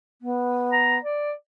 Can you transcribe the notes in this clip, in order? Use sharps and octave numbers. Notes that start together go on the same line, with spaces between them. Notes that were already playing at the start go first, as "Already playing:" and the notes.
B3
A#5
D5